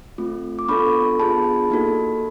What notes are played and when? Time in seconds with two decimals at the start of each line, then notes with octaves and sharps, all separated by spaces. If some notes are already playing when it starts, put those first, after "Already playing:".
0.18 A3 C4 F4
0.59 D6
0.68 B3 D4 F4 A4 B5 C#6
1.20 B3 D4 F4 G#4 A5 B5
1.71 A#3 D#4 F#4 A4